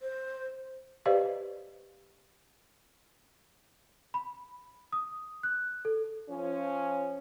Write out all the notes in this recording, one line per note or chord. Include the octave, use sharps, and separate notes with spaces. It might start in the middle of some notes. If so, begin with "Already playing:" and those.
C5
G4 B4 C5 D5 D#5 F5
B5
D#6
F#6
A4
F3 C#4